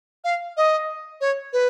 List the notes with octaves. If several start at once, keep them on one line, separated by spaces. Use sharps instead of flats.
F5
D#5
C#5
B4